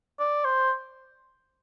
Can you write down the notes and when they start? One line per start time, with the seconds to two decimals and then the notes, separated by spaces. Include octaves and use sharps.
0.19 D5
0.45 C5